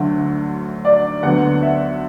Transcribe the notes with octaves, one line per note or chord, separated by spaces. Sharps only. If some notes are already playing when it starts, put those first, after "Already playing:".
Already playing: D2 D3 F#3 A3
D5
D2 D3 F#3 B3 F#5
E5